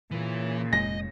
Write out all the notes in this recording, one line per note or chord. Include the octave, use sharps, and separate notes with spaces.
A#2 C#3 E3
F1 G#3 D#5 A#6